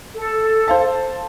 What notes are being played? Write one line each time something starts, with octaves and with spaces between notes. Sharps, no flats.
A4
C5 F5 A5